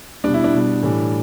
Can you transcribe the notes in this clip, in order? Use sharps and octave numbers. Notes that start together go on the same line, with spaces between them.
B2 G3 D4
E4
D4
B2 G3
A2 E3 G3